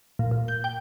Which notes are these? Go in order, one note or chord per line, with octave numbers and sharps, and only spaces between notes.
A#2
A#2
G6
G5